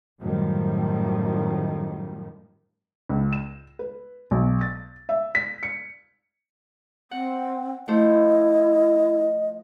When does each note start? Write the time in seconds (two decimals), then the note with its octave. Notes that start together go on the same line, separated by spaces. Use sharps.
0.21 F#2 A2 D#3 F3 G3
3.09 C#2
3.33 E7
3.79 B4
4.31 B1
4.61 A6
5.09 E5
5.35 B6
5.63 C#7
7.11 C4 F#5
7.88 F3 A3 E4 C5 D#5